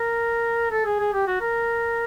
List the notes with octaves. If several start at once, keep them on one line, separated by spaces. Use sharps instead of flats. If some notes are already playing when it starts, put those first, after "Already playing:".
Already playing: A#4
A4
G#4
G#4
G4
F#4
A#4